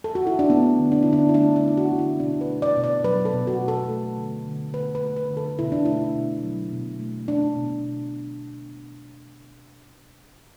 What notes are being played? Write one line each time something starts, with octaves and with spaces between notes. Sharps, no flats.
A4
F#4
E4
D4
A3 B3
D3
D4
D3 E4
D4
E4
A3 D4
D4
A3 E4
F#4
D3
E4
B2 D4
B4
A3
D5
B2
D5
F#3 B4
A4
B2
F#4
A3
A4
A3
D3
D3
A3 B4
B4
A3
B4
D3
A4
B2 E4
D4
A3 E4
B2
F#3
B2
A3
A3 D4
B2